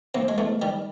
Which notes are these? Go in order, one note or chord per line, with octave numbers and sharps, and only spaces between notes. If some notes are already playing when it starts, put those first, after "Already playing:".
C3 A#3
G#3
E2 A3
D#3 G3